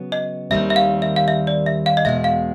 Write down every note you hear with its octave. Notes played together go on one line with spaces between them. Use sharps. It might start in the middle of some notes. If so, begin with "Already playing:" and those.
Already playing: C#3 F#3 B3
D#5
D#2 D#3 G3 C4 E5
E5
F5
E5
F5
E5
D5
E5
F5
D#5
E2 B2 G#3 E5
F5